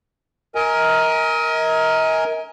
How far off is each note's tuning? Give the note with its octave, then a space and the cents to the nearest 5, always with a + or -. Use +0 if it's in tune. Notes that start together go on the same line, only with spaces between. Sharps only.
A#4 +5 D#5 +40 G#5 +0